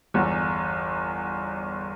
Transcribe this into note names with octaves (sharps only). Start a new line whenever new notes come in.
G1 E2